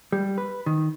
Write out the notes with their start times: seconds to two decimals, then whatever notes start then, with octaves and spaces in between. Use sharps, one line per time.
0.12 G3
0.38 B4
0.66 D#3